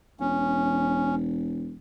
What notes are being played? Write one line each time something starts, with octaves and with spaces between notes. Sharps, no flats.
E1 C#4